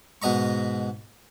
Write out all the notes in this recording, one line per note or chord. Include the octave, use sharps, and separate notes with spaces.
G#2 B2 D#5 A#5 C#6